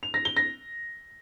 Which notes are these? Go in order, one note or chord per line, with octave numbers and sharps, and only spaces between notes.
F7
A#6
G7
A#6